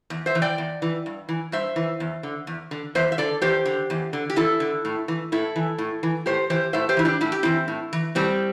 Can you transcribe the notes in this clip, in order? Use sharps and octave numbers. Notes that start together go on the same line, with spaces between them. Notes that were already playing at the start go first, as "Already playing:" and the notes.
E2
C5 E5
E3
D5 G5
E2
E3
G2
E3
G2 C5 E5
E3
E2
D3
E2
D3
E2 C5 E5
E5
D3 A4 D5
E2 G4 C5
D3
E2
D3
G4
E2 E4 A4
D3
A2
E3
A2 E4 A4
E3
A2
E3
A2 G4 C5
E3 G4 C5
A2 C5 E5
G4 C5
E3 E4
D4 G4
A2 E4
G4
E3 C4 E4
A2
E3
A2 G3 C4